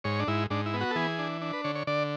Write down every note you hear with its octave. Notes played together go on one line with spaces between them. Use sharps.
G#2 C#5
D4
G#2 E4
G#2 D4
E4
B3
F#4
A4
E3 G#4
D4
D4
B4
D3 C#5
C#5
D3 D5